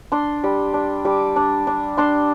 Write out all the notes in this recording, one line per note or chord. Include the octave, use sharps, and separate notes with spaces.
D4 C6
G3
D4
G3 D6
D4
D4
D4 C6